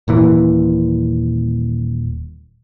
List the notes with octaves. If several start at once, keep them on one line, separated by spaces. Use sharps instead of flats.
D#1 A#2 E3